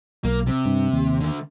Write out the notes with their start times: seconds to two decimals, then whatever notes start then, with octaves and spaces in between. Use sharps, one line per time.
0.24 B1 A#3
0.47 C3
0.65 G2
0.93 D#2
1.20 D3 A3